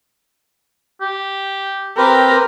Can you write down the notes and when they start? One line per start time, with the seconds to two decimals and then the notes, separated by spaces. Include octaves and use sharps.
1.01 G4
1.97 C4 G4 A#4 B4